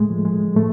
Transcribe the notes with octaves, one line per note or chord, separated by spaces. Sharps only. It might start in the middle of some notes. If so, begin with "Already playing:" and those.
Already playing: A2 G#3 A3
F3
G#3
A2 A3